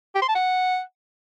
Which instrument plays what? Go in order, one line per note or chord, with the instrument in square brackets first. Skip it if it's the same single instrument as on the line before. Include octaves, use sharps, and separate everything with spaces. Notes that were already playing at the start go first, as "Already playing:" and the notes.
[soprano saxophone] G4
C6
A5
F#5